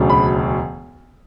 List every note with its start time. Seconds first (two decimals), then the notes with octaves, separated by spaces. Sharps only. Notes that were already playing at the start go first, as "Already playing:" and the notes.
Already playing: E1 D2 C#3 F#3
0.10 B5